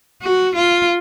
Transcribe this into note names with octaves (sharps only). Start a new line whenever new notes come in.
F#4
F4